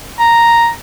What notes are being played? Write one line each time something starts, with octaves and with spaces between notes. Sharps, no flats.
A#5